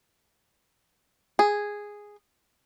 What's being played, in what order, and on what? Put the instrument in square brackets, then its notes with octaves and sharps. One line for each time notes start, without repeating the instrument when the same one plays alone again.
[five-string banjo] G#4